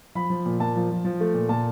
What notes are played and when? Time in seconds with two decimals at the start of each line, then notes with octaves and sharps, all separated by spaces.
0.15 F3 B5
0.30 F3
0.46 A#2
0.60 A#2 A5
0.76 F3
0.91 F3
1.05 F3
1.20 A3
1.34 A#2
1.49 A#2 A5